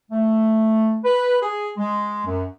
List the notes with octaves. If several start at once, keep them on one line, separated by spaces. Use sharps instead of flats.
A3
B4
G#4
G#3
F#2